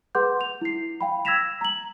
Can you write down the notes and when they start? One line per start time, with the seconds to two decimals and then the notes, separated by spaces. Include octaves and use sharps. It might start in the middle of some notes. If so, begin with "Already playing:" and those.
0.15 G#4 B4 F#5 C6 D6 G6
0.41 F7
0.62 E4 C7
1.01 F5 G5 B5
1.25 E6 G#6 A#6 B6 E7 F7
1.61 A#5 F#7